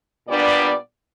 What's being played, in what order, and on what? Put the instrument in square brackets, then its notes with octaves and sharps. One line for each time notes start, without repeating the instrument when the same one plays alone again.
[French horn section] A#2 G3 B3 D4 D5